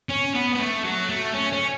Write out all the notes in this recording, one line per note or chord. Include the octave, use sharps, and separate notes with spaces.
C#4
B3
B3
A3
F#3
A3
C#4
C#4